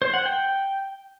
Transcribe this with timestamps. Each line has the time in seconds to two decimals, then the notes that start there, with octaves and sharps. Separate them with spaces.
0.02 C5
0.14 F#5
0.25 G5